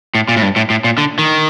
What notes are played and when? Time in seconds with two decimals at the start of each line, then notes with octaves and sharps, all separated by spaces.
0.15 A2
0.28 A#2
0.36 A2
0.42 G2
0.56 A2
0.70 A2
0.84 A#2
0.98 D3
1.19 D#3